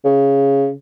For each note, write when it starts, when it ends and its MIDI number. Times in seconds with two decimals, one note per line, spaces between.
0.05 0.71 49